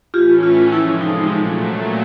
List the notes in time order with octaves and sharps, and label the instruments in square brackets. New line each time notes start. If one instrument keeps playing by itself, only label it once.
[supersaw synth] A2 E3 A3 C#4 [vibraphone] F4 G4
[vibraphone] F4
[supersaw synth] C3 F3 G#3 [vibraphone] E4
[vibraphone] D#4
[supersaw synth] A#2 F#3 A3